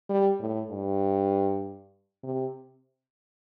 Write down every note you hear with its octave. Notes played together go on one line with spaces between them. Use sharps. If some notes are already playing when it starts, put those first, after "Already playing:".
G3
A2
G2
C3